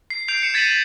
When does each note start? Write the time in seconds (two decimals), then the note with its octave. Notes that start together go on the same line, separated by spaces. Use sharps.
0.10 C7
0.28 G6 C7 D7 F7
0.42 C7 C#7 E7
0.54 G#6 A6 B6 C7 D#7 F#7
0.70 G#6 A6 F#7